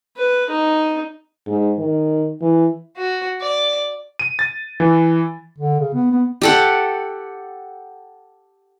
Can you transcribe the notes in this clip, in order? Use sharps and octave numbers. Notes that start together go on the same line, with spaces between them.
B4
D#4
G#2
D#3
E3
F#4
D5
D#7
A6
E3
D3
C#3
B3
B3
G4 A4 F#5